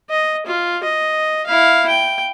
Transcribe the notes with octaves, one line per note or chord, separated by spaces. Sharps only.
D#5
F4
D#5
E4 F5
G5